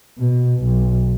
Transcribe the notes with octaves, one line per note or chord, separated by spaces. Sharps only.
B2
B1